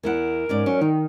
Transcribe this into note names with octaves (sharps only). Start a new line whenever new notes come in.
E2 E4 A#4 F#5
G#2 C#4 D5
F#3 C#4
D#3 D#4